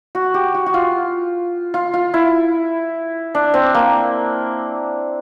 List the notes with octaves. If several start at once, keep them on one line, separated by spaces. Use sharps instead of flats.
F#4
G4
F#4
F#4
F4
F4
F4
E4
D4
C4
A#3